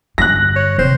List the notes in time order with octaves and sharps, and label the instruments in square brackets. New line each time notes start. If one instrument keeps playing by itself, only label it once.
[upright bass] G2 D3 [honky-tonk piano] F#6 A#6
[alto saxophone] C#5
[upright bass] D#1 C3 [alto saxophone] C5